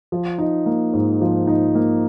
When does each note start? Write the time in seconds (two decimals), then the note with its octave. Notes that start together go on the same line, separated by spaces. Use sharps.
0.12 F3
0.38 D#4
0.66 A#3
0.93 G#2
1.21 F3
1.47 D#4
1.75 A#3